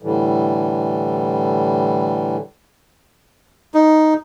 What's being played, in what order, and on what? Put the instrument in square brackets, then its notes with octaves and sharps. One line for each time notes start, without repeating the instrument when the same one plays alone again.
[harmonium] A2 D3 E3 G3
[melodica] D#4